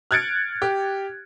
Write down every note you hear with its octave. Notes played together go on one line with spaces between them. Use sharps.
F6 F#6 G#6 A6 C#7 D7
G4